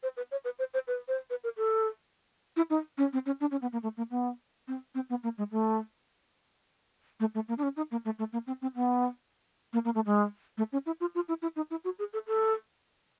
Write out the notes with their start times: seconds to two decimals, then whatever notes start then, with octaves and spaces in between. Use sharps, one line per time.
0.03 C5
0.17 B4
0.32 C#5
0.45 B4
0.59 C5
0.74 C5
0.88 B4
1.08 C5
1.30 B4
1.44 A#4
1.57 A4
2.57 E4
2.70 D#4
2.98 C#4
3.13 C4
3.26 C#4
3.40 D4
3.51 C#4
3.62 B3
3.73 A#3
3.83 A3
3.97 A#3
4.11 B3
4.68 C4
4.95 C4
5.10 B3
5.24 A#3
5.38 G#3
5.52 A3
7.20 A3
7.35 A3
7.49 A#3
7.58 D4
7.63 C#4
7.77 D#4
7.91 A#3
8.05 A3
8.19 A3
8.33 A#3
8.47 C4
8.62 C4
8.75 B3
9.73 A#3
9.85 A#3
9.95 A3
10.06 G#3
10.58 A3
10.72 C#4
10.86 E4
11.01 F4
11.15 F4
11.28 E4
11.42 E4
11.56 D#4
11.71 E4
11.84 F#4
11.99 G#4
12.13 A4
12.27 A4